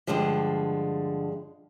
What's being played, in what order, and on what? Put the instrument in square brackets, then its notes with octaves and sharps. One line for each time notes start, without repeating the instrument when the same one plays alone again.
[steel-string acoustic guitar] G2 D3 F3 G#3